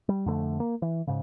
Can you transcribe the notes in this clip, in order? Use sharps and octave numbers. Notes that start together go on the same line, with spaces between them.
G3
F2 D3 A3
A#3
E3
G#2 C#3